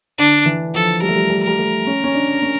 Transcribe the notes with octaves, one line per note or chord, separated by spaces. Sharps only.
D3 D4
E3
F3 A4
G3 A#4
A3
G3
G3
G3 A#4
A3
C#4
C#4
D4
C#4